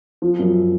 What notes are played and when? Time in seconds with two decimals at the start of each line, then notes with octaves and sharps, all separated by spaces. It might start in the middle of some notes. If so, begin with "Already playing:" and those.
0.22 F3
0.39 F#2